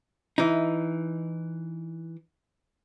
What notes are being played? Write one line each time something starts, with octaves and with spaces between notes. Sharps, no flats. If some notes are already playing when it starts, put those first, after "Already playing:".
E3 D#4